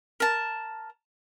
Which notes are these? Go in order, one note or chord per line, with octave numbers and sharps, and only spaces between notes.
A#4 A5